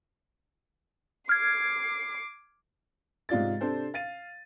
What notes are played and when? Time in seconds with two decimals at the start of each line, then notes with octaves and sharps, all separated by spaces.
1.29 D6 F6 G#6 C7
3.29 G#2 C3 F4 D5 A6
3.61 C3 C4 D4 A4 C5
3.94 F5 A6 D#7